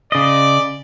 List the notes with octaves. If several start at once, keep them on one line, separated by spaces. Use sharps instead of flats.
C#3 D5 D#5